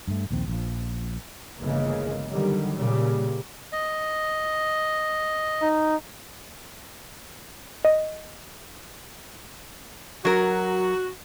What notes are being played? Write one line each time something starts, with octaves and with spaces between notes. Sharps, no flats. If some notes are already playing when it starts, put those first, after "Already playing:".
G2 A3
A#1 D#2 C4
A#1 F3
G1 C#3 E3 G#3 A#3
D3 D#3 F#3 G3
A#2 C#3 G3
D#5
D#4
D#5
F#3 F#4 A#4